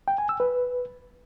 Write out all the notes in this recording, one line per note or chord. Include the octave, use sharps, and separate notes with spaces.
G5
G#5
E6
B4